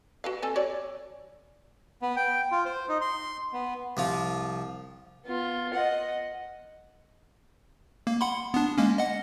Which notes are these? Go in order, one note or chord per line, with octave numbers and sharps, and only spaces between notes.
F#4 B4 F5
C4 A4 G#5
F#4 C#5 D5
B3
G5
F4
C5
D#4
C6
B3
C2 F3 F4
B3 F4
D#5 F#5
A#3
F#5 B5 C6
B3 D4
G#3 A#3 C#4
D#5 F#5